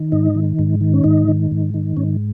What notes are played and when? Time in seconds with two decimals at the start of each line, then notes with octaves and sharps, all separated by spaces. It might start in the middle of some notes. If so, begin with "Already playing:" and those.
Already playing: D#3
0.12 G#2 D#4
0.35 D#3
0.59 G#2
0.81 D#3
0.94 C#4
1.04 G#2 D#4
1.28 D#3
1.51 G#2
1.74 D#3
1.97 G#2 C#4